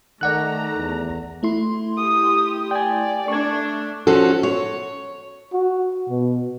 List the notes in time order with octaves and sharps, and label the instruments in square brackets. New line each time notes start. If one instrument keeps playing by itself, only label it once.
[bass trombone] D#3 [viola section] A3 A#5 [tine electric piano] D5 F#5 F#6
[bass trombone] E2
[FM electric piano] A3 E4 C6
[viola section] G4 [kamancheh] D#6
[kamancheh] D5 [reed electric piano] G5 G#5
[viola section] A3 D4 [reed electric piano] C#6 G#6
[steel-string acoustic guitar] F3 C#4 F#4 A4
C#5
[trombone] F#4
B2